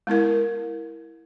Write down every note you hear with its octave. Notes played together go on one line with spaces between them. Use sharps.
G#3 B3 E4 A#4